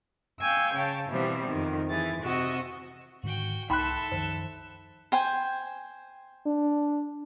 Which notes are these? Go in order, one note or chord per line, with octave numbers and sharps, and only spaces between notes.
F5 G5 G#5 C#6 E6
C#3 C#5 F5 G5 A5
B2 E3 F3 G3 B3 C4
F2 D#3
E3 G#4 A6
C3 F#4 D#5 C#6 E6
G#2 D3 D#3 F#4 G5
C2 D#4 A4 E5 G5 B5 C6 F#6
F#2 D#3 F3 C5
C5 G5 G#5
D4